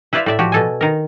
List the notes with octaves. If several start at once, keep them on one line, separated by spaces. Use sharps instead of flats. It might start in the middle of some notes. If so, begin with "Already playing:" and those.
E4 B4 C5 D5 E5 F5
A2 D5 E5
F3 F#4 G4
B2 A4 G#5
D#3 A#4